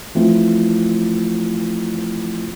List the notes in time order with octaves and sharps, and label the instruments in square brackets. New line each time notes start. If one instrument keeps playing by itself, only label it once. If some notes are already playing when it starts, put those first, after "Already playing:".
[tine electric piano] E3 F3 A3 C4 E4 F4